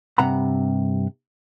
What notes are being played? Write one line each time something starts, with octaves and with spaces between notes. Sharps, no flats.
G2 C3 F#5 A#5 B5